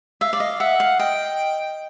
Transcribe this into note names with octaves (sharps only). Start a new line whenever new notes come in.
E5 F5
D5
D#5
E5 F#5
F5
D#5 G5